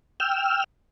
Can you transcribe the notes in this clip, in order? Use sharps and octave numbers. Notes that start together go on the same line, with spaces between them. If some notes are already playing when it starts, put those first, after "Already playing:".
G5 E6 F6